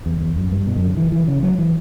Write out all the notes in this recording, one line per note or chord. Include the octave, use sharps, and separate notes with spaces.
E2
E2
F#2
G2
B2
F#2
D3
E3
E3
C#3
F#3
E3